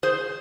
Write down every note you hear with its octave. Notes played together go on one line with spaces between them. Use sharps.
G#4 C5